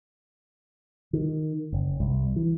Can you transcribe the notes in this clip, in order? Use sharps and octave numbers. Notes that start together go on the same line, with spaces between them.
D#3
F#1
C2
E3